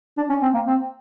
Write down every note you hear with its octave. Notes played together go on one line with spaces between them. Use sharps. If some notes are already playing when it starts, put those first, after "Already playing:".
D4
C#4
C4
A#3
C4